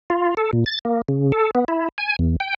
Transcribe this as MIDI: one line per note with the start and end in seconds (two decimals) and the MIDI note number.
0.10 0.35 65
0.37 0.51 69
0.53 0.64 46
0.66 0.79 93
0.85 1.02 58
1.08 1.32 49
1.32 1.51 69
1.55 1.64 59
1.68 1.89 64
1.98 2.16 80
2.19 2.36 40
2.40 2.54 79